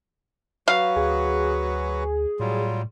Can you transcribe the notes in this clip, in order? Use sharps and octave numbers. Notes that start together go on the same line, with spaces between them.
F#3 F#4 B4 F5
D2 G#4
A2 F#3 G3 F4